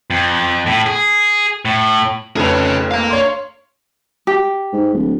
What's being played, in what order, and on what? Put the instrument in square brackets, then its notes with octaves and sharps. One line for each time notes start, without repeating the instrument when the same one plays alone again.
[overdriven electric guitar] F2
A2
G#4
A2
[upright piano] F1 F2 B4 [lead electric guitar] G#4 C#5
[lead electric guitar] F5 A#5
[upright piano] C#5 C6
[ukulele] G4
[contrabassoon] G#2
D1